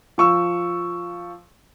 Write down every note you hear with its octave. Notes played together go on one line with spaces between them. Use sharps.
F3 C#6 E6